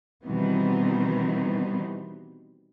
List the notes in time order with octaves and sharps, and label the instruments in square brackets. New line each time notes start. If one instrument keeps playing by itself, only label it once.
[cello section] B2 D#3 E3 G3 B3 C4